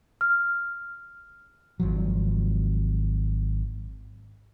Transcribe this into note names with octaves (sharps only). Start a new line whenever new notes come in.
F6
G#1 F3 F#3